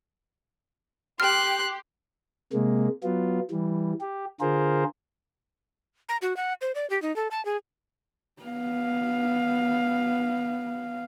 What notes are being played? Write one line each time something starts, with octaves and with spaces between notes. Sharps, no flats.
G4 G5 C6 F6 F#6
C3 G#3 A#3
F#3 B3 F4
E3 G3
G4
D3 F4 G#4 A#4 C5
A#5
F#4
F#5
C5
D5
G4
D#4
A4
A5
G#4
B3 F5